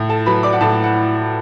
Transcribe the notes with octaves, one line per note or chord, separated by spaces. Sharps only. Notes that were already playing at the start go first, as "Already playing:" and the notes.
Already playing: A2
A4 A5
F#3 B4 B5
D5 D6
F#5
A2 A4 A5
F#5